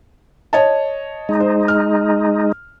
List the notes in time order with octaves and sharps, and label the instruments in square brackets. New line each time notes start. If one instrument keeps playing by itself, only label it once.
[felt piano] C#5 D#5 A5
[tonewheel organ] G#3 D#4
[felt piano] C5
F6